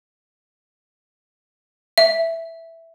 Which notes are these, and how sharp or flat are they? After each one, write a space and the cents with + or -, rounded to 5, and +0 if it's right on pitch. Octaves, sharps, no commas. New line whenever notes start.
E5 +0